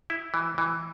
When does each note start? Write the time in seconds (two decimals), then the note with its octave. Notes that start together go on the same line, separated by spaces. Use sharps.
0.10 E4
0.34 E3
0.58 E3